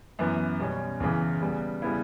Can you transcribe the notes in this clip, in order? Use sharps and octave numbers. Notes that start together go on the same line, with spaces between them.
F#2 E3 B3
B2 G3 C#4
E2 C#3 E3
C#3 G3 B3
C#3 G3 B3 E4